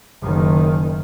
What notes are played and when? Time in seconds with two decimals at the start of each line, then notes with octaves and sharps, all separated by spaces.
0.23 F#1 D#3